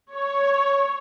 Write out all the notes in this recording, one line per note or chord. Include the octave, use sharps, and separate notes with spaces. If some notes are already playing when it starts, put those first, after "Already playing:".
C#5